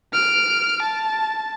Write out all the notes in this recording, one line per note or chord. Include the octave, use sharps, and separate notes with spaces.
F6 D7
A5